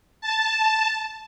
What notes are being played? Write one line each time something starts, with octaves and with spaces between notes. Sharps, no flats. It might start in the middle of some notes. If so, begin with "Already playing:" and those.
A5